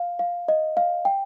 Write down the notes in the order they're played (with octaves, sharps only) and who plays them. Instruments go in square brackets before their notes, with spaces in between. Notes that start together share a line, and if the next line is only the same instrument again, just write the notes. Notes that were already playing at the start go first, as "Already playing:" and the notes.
Already playing: [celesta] F5
F5
D#5
F5
G5